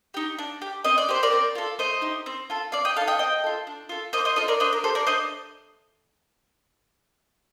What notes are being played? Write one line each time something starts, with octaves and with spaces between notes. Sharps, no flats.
D#4 G4
D4
G4
C4 D#5
D5
G4 C5
A#4 D5
C4
F4 A4
A3 C5 D#5
D#4 G4
C4
F4 A4
C4 D5 F5
D#5 G5
D#4 A4 F5 A5
D#5 G5
C4 D#5 G5
F4 A4
D4
F4 A4
A#3 C5 D#5
C5 D#5
F4 A4 C5 D#5
A#4 D5
D4 C5 D#5
A#4
G4 A4 C5
A#4 D5
D4 C5 D#5